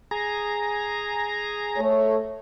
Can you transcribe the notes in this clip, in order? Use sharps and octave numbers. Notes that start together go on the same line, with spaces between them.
G#4 A#5
A3 C#5